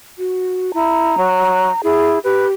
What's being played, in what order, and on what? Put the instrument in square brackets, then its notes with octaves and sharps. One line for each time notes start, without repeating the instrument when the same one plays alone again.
[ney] F#4
[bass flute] E4 [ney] A#5
[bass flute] F#3
[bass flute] E4 [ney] G#4
[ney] G4 [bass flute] B4